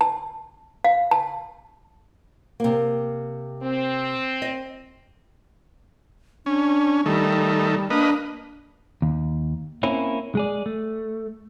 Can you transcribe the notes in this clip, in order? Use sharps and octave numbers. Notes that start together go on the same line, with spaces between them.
A5
F5
A5
C3 A#3
C4
D#5
C#4 D4
D#3 G3 A3
A#3 D4 B4 D#5
D#2
A#3 C4 C#4 E4
G#3 G#4 D5
A3